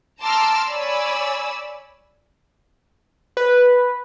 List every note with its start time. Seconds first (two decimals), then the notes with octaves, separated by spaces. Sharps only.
0.21 A5 A#5 C6 D6 E6 F6
0.70 C#5 D5 G#5 B5 E6
3.37 B4